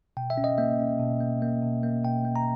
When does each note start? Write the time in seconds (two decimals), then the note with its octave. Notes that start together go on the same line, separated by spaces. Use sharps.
0.17 B2 G5
0.30 E5
0.37 C#4
0.44 D#5
0.58 A#3 E5
0.80 C#4
1.00 B2
1.20 A#3
1.42 A#3
1.62 B2
1.83 A#3
2.04 B2 G5
2.25 A#3
2.36 A#5